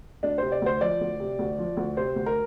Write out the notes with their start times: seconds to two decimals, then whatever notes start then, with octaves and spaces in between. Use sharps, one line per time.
0.23 D2 D4
0.38 C3 C5
0.52 D5
0.62 D2 C5
0.81 F3 D5
1.01 D2
1.20 C3
1.39 D2
1.58 F3
1.77 D2
1.97 C3 C5
2.16 D2
2.26 A#4